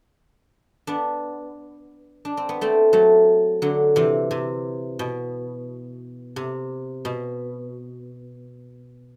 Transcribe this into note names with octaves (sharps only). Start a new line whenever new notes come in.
B3 D4
D4
C4
B3
A3 C4
F#3 A3
D3 F#3
C3 E3
C3
B2
C3
B2